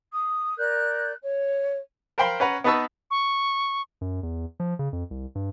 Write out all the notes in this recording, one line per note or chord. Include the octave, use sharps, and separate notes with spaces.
D#6
A#4 D5 F#6 G6
C#5
A#4 C5 F5 G5 B5 C6
C#4 B4 F#5 A#5
B3 D#4 B4 A5 C#6 E6
C#6
F#2
E2
F3
C#3
F2
C2
G2